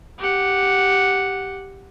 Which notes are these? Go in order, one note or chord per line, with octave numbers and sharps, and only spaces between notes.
G4 F#5